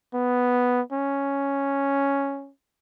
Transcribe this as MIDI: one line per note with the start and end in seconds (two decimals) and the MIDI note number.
0.14 0.81 59
0.92 2.51 61